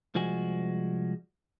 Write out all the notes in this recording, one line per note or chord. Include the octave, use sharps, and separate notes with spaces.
C2 F3 G#3 F#4 G#5